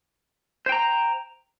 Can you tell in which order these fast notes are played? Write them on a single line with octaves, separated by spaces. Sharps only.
C5 G5 A#5